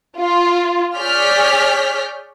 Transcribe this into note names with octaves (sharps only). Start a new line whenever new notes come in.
F4
G#4 C#5 D5 F6 G6 B6